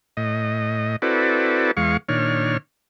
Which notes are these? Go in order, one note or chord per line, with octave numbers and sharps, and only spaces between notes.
A2 D#5
C4 E4 F#4 A4 B4 D5
E2 G#3 F5 C#6
A#2 D#3 D4 C#5 F6